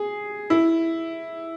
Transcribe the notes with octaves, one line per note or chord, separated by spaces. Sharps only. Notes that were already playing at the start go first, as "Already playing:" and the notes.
Already playing: G#4
E4